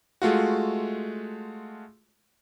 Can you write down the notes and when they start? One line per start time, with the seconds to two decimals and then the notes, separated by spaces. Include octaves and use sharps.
0.22 G#3 A3 F4 F#4